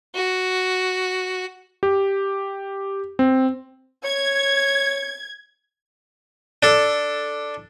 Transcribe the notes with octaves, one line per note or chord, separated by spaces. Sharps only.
F#4
G4
C4
C#5 G#6
D4 A4